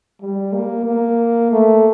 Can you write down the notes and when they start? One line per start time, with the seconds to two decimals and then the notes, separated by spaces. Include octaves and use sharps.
0.21 G3
0.54 A#3
0.86 A#3
1.52 A3